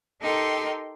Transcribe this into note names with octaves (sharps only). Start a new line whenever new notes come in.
D#4 G4 A4 A#4 G5 C6